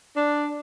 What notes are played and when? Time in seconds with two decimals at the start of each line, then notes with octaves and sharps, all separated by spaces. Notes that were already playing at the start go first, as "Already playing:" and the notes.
0.16 D4